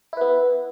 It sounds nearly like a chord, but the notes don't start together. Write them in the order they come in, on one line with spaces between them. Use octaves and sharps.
E4 B4 B3